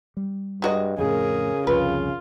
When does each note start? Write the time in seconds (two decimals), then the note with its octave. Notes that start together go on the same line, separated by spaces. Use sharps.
0.17 G3
0.62 G2 G#3 F#4 D#5
0.98 F2 A2 C#3 G#4 A#4
1.67 C2 F2 F4 B4